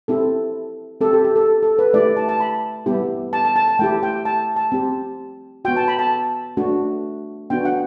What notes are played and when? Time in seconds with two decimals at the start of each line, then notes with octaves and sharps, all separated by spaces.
0.08 C4 E4 G4 A4
1.01 C4 G4 A4
1.13 G4
1.24 G4
1.36 A4
1.63 A4
1.79 B4
1.94 A3 E4 G4 D5
2.17 A5
2.29 A5
2.40 B5
2.86 G3 B3 E4 G4
3.33 A5
3.45 A5
3.56 A5
3.68 A5
3.79 A3 E4 G4 G5
4.03 G5
4.25 A5
4.56 A5
4.72 C4 G4
5.65 B3 F#4 G5
5.76 A5
5.88 B5
5.99 A5
6.57 A3 D4 F#4
7.50 B3 D4 F#4 G5
7.65 F#5